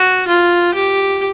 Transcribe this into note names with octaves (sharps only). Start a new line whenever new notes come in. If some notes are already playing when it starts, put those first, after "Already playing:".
Already playing: F#4
F4
G4